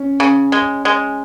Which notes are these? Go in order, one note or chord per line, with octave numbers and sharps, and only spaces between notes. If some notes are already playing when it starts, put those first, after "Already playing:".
Already playing: C#4
C#3
G#3
G#3